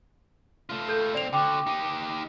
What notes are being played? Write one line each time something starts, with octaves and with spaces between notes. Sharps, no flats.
A3 F4
A4 G6
B1 C4 D5 F7
D3 F#4 G5 D6
D#4 G4